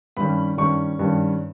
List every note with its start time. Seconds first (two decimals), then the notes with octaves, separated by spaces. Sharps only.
0.17 G2 D#3 G3 C#4 B5
0.57 G2 D#3 G3 C#4 C#6
0.99 G2 D#3 G3 C#4